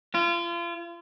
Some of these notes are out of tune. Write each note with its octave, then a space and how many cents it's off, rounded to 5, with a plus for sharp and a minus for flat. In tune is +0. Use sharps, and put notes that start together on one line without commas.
F4 -35